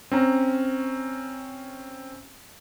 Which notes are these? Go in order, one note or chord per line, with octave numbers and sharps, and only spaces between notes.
C4 C#4 A#5